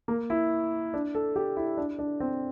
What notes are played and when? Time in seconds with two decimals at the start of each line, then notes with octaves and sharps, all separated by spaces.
0.08 A#3
0.30 E4
0.94 D4
1.15 A4
1.36 G4
1.57 E4
1.77 D4
1.99 D4
2.20 C4